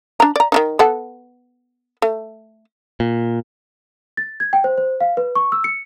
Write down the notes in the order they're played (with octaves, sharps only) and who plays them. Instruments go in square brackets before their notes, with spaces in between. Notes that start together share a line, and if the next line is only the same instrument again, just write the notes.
[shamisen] D4 A#5
D5 A#5
D#3 D4 D#4
B3 A4 F#5
A3
[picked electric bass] A#2
[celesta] A6
G#6
G5
C5
C5
F5
B4
C#6
E6
C#7